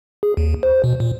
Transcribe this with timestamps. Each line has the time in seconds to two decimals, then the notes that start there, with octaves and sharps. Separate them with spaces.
0.23 G#4
0.37 D#2
0.63 C5
0.84 B2
1.00 A#2